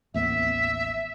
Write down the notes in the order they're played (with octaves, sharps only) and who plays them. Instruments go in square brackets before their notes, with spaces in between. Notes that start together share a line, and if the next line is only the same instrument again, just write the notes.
[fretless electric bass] A1 D#2 B3 [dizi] E5